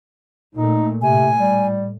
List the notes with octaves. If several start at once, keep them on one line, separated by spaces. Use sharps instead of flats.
A#2 A3 D#4
A2 C3 G#5
G3